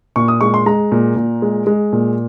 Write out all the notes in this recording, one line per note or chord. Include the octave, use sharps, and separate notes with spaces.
A#2 C#6
D#6
G#3 C#6
C6
G#3 A#5
A#2
A#2
G#3
G#3
A#2